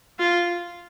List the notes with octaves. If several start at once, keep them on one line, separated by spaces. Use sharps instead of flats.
F4